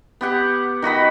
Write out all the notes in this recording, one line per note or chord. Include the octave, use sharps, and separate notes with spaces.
B3 G4 F#5
D#3 F#4 D#5 B5